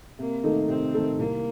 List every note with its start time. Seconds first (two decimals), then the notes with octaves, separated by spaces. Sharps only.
0.19 C3 A#3
0.44 D#3 A3 D#4 A4
0.68 C3 C4
0.94 D#3 A3 D#4 A4
1.18 C2 A#3